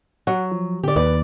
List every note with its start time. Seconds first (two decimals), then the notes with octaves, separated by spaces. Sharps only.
0.27 F#3 F#5
0.51 F3
0.83 D3 G4 D5
0.96 D#2 B4 D5